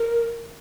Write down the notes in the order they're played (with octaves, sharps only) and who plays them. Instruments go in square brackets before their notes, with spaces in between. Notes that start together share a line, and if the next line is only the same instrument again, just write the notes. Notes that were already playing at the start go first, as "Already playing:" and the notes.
Already playing: [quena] A#4